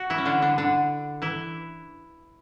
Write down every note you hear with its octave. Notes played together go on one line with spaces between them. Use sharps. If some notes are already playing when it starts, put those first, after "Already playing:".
Already playing: F#4
E3 E4
C#4
D3 D4
D3 D4
D3 D4
E3 E4